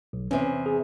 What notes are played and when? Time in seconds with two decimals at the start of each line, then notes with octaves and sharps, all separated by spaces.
0.13 B1
0.31 E2 C3 C#4
0.66 G#4